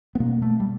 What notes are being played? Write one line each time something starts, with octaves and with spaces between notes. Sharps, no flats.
B3
B2 A#3
A3
G3